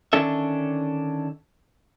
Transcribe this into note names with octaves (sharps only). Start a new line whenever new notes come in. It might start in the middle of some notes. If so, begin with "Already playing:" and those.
D3 D#3 C#4 D4 A4 E5